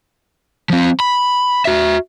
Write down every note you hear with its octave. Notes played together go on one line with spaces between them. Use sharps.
F3 C4
B5
F#4 E5